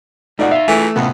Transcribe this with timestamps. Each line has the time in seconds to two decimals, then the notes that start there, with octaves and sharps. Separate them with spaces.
0.39 B2 A3 D#4 F4 D5 F#5
0.51 D#4 E5 F5
0.68 E3 A3 F4 G#4
0.96 F2 A2 C3 B3 C#4